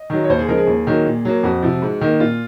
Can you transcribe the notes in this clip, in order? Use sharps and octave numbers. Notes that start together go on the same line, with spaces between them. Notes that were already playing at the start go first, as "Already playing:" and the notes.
Already playing: D#5
D#3 F#3
C#5
D#2 C5
G#4
C#3 F3 G#3 A#4
G#4
D#2
D#3 F#3 A#3
A#2
F#3 A#3
F2 F#4
C3 F3
G#2
D#3 A#3
A#2 F4